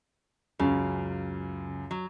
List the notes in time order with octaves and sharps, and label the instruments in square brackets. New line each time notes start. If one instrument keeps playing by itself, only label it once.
[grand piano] C#2 F#2 [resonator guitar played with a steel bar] C#3
[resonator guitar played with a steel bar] F#3